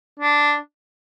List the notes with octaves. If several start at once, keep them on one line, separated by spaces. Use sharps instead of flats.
D4